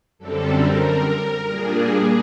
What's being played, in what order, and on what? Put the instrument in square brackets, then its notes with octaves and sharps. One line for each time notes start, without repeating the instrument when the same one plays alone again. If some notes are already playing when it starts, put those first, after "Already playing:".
[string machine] F#2 D3 G3 C4 A4
A#4
A#2 G3 A#3 D4 G#4